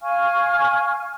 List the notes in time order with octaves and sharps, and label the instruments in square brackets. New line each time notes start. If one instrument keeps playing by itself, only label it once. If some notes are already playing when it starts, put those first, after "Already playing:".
[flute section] F5 G#5 C#6 F6